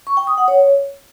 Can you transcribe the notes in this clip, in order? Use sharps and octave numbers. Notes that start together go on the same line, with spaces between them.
C#6
G5
D#6
F#5
C#5